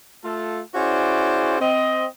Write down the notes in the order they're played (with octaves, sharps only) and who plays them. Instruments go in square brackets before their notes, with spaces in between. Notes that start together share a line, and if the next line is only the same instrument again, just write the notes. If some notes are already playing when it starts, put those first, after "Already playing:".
[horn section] A3 F4 A4
C#4 E4 F#4 G#4 C5 D5
C4 D#5